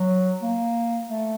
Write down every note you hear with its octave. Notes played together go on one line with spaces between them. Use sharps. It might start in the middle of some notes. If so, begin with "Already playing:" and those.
Already playing: F#3
A#3
A3